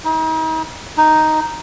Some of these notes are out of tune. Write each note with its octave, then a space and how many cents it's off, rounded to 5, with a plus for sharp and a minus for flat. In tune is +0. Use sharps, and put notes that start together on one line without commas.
D#4 +40
D#4 +0